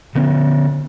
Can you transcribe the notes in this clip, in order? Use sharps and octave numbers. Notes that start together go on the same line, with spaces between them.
D3 B3 C#4